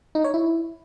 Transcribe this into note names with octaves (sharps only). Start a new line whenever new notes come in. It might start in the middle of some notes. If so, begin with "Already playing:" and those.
D#4
C#5
E4